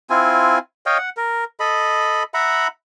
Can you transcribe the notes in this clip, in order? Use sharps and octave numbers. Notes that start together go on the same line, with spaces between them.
C4 E4 F4 G#5
C#5 D#5 F5 G5
F#5
A#4
A4 D#5 B5
E5 F#5 A#5 B5